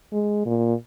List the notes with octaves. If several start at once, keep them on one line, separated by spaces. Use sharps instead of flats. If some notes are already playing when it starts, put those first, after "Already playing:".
G#3
A#2